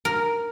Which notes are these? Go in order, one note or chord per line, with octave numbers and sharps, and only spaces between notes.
A#4